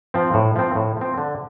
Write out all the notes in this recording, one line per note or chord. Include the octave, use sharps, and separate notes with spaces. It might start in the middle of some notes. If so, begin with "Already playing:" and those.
F3 C4
A2
F3 C4
A2
F3 C4
D3